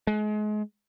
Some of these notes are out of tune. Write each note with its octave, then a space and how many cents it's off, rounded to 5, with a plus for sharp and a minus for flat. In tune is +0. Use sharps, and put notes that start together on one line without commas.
G#3 +35